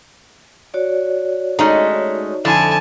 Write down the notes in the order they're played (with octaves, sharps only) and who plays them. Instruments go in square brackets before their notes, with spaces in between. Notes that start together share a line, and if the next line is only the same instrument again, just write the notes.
[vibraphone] F#4 C#5 D5
[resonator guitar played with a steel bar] G#3 A3 C#4 [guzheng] D#4
[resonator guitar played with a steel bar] F2 D3 E4 [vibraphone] A4 [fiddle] G#5 A5